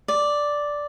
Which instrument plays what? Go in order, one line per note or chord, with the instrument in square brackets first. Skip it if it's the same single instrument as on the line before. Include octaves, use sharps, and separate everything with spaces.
[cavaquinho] D5